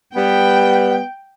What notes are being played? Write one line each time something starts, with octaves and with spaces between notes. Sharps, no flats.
G3 B3 G5